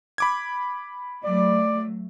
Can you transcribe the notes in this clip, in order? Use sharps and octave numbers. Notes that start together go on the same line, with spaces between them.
B5 D6 G#6
F#3 A3 D5